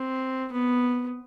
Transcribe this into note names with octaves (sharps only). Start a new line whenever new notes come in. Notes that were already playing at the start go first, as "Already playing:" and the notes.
Already playing: C4
B3